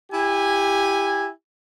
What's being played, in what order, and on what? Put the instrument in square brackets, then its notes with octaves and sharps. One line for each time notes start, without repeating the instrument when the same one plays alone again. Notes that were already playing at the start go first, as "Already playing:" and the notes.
[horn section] E4 G4 G#5